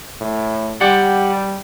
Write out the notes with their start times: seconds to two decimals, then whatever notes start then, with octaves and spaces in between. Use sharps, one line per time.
0.21 A2
0.81 G3 G4 D5 F#5